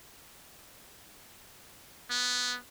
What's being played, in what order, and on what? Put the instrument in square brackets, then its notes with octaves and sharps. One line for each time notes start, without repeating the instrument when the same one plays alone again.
[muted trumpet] B3